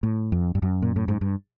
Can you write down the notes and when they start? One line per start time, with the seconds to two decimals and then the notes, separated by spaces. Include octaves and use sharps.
0.03 A2
0.32 F2
0.55 G2
0.62 F#2
0.82 A#2
0.96 A2
1.08 G#2
1.21 G2